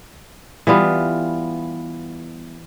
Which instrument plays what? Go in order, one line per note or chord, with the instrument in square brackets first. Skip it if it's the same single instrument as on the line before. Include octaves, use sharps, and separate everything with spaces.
[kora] E3 G3 B3 F4